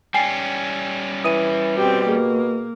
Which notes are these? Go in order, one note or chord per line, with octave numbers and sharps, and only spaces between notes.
G3 C#4 G5 G#5 C7
E3 D#6 D#7
B2 C4 G4
A#3 G#4